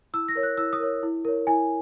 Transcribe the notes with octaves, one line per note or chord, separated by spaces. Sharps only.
E4 E6
A#6
A#4 C#5
F#6
E4 E6
D#6
A#4 C#5
E4
A#4 C#5
E4 G#5